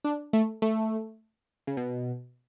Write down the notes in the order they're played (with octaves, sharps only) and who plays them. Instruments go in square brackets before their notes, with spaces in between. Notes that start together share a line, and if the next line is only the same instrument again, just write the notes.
[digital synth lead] D4
A3
A3
C#3
B2